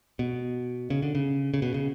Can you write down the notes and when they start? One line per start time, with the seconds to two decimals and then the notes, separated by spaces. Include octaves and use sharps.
0.19 B2
0.90 C#3
1.03 D3
1.15 C#3
1.54 C#3
1.62 B2
1.74 C#3